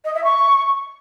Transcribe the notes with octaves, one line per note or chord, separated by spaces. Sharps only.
D#5
E5
C#6